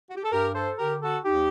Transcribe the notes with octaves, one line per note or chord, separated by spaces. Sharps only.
F#4
G4
A4
G2 G4 A#4
A4 C5
D3 G4 A#4
F#4 A4
D#2 D#4 G4